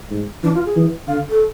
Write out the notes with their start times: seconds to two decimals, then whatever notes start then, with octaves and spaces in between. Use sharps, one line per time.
0.11 G#2
0.43 E3 D4
0.54 F4
0.65 G#4
0.76 E3
1.07 D3 F5
1.29 A4